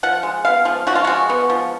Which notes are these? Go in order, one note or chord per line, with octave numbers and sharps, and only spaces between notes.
F3 F#5
G#3
B3 F5
F3
F3 F#4
F4
G#3 F#4
B3
F3